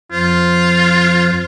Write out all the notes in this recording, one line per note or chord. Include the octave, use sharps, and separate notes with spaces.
F2 F3 F4 C5